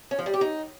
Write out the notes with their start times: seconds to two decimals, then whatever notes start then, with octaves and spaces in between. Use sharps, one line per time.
0.11 C#4
0.19 F3
0.26 G3
0.34 G4
0.41 D#4